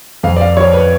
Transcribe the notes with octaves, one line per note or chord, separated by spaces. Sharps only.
F2 F5
D5
F5
F3 C#5
B4